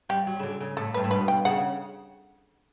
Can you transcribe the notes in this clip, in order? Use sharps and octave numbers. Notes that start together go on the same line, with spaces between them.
G3 G4
F#3
C#3
D3
C#3
A2 A4
G2 B4
A2
B2 B4
G5
C#3 F#5